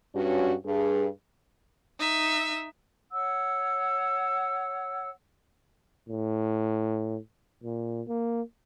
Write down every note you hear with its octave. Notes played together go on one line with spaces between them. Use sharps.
G2 C#4 F#4
G2 G#4
D#4 E5
C#5 F#5 E6
A2
A#2
A#3